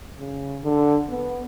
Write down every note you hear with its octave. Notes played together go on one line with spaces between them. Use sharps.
C#3
D3
B3